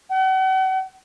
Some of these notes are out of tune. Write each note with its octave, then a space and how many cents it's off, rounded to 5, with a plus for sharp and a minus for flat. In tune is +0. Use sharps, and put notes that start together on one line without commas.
F#5 +40